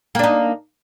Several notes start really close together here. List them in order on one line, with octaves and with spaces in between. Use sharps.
A#3 D4 D#4